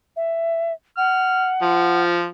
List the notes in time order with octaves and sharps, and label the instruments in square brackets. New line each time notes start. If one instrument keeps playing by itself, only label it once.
[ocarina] E5
[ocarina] F#5 [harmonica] F6
[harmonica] F3